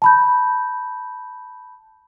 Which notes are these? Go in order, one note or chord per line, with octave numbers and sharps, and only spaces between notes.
A5 B5 G6